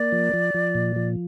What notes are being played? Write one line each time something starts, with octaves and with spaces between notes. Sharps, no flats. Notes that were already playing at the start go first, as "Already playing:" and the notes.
Already playing: A#3 D5
F3
F3
F3
A#2
F3